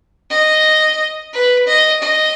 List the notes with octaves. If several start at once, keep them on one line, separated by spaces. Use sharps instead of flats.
D#5
B4
D#5
D#5